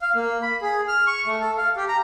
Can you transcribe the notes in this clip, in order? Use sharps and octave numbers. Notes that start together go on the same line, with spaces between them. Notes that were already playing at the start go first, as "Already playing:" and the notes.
F5
A#3
B5
G#4
F6
C#6
A3
A4
F5
G4
A#5